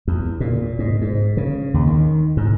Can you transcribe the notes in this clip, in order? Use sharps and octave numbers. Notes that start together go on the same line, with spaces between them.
E2
A#2
G#2
G#2
C#3
D#2
D#3
G#2